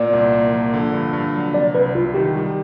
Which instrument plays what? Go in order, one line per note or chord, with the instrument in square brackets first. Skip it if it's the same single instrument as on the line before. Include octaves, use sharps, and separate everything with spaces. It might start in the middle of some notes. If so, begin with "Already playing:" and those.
Already playing: [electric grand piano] A#2 A#3 [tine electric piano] D5
[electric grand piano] C2
A#3
F3
D3
G2
G2
F#3
[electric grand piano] C3 [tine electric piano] D5
[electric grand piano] C2 [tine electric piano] B4
[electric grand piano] C2 [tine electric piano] F4
[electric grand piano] D#3 [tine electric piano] G4
[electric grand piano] G3